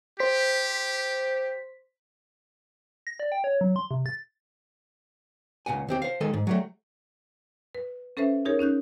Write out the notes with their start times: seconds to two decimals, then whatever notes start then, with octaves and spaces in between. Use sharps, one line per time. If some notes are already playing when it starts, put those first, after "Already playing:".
0.20 G4 C5 B6
3.07 A#6
3.20 D5
3.32 G5
3.44 C#5
3.61 F#3
3.76 C6
3.91 C3
4.06 A6
5.66 C#2 A#2 F#5 G#5
5.89 D#2 C4 G4
6.02 C5 F5
6.21 D#3 G#3 A4 G#5
6.34 G#2
6.47 F#3 G3 A3
7.75 B4
8.17 C#4 A4 B4 C5 E5
8.45 D#4 G4 G#4 A#4 C#5
8.59 C#4 D#4 F#6 G6